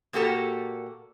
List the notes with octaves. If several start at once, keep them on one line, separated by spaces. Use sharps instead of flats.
A#2 A#3 F#4 G4 A4 A#5